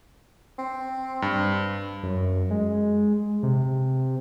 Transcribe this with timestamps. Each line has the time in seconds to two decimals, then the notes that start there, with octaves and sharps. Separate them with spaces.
0.58 C4
1.22 G2
2.03 F#2
2.51 G#3
3.43 C3